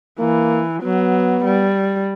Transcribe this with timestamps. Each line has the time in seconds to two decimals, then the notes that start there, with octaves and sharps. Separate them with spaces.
0.19 E3 A#3
0.83 F#3 B3
1.45 G3